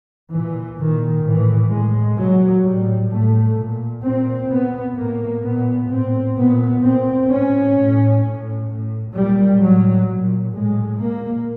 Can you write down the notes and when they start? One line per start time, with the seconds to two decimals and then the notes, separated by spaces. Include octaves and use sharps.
0.33 A#2 E3
0.79 A#2 D#3
1.25 A2 E3
1.72 A2 G#3
2.18 A#2 F#3
2.65 A2 G3
3.11 A2 A3
3.57 A#2
4.04 A#2 C4
4.50 A#2 B3
4.97 A2 A#3
5.44 A#2 B3
5.90 A2 C4
6.36 A#2 B3
6.83 A#2 C4
7.29 A2 C#4
7.76 A2
8.23 A2
8.68 A2
9.15 A#2 G3
9.62 A2 F#3
10.08 A#2
10.55 A2 G#3
11.01 A#2 A#3